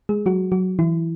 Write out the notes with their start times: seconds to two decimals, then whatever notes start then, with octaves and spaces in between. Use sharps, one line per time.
0.09 G#3 G#4
0.26 F#3 F#4
0.52 F#3 F#4
0.79 E3 E4